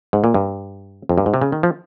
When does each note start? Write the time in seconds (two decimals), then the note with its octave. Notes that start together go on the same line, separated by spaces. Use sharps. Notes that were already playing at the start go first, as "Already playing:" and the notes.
0.13 G#2
0.24 A#2
0.34 G2
1.09 F2
1.18 G2
1.26 G#2
1.34 C3
1.42 C#3
1.52 D#3
1.63 F3